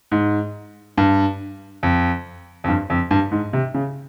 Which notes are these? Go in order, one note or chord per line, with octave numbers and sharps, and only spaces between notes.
G#2
G2
F2
F2
G2
F2
G2
G#2
C3
C#3